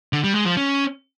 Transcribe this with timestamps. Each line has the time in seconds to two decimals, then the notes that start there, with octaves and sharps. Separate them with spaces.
0.13 D3
0.24 G3
0.35 G#3
0.46 F3
0.57 C#4